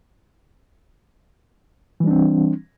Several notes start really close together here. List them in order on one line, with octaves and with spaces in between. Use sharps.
E3 G3 D4 C4